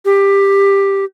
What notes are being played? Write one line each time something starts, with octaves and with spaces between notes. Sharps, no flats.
G4